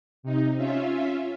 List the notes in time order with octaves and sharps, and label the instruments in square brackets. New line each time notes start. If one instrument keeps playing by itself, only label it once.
[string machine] C3 D#4
C#4 F4 E5